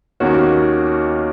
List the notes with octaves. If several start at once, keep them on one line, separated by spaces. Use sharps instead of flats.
D#2 D#3 A#3 C#4 F#4